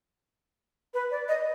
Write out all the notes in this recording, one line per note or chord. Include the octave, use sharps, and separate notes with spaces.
B4
D5
D#5